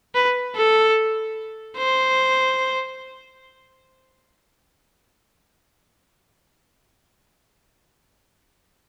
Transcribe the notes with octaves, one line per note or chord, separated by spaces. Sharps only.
B4
A4
C5